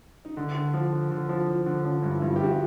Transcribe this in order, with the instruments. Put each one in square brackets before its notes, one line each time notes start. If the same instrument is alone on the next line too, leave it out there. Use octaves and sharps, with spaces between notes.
[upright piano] D#4
[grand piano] D3 [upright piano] D4
[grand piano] D3
F3
D3
D3
F3
F3
D3
[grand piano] F3 [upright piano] C#4
[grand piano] G2
[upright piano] E4
[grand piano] G2 [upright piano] F4
[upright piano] G4
[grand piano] G2 [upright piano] F#4
[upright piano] F4